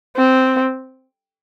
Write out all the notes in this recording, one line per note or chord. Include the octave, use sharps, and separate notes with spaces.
C4